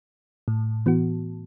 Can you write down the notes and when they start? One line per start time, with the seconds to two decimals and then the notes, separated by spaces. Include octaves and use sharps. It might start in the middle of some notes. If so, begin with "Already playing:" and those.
0.48 A2
0.86 E3 B3 F#4